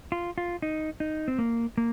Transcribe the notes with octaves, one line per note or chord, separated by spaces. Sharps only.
F4
F4
D#4
D#4
C4
A#3
A#3